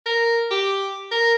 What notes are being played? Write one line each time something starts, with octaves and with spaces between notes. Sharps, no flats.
A#4
G4
A#4